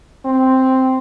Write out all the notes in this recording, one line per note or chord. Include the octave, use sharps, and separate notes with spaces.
C4